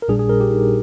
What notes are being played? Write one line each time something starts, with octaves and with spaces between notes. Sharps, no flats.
A#4
A#1 A#2 G3 D4 G#4
G#4
A#4
G4
D#4